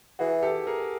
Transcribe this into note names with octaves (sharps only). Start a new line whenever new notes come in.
E3 F#4 G#4
G4 A4
G#4 A#4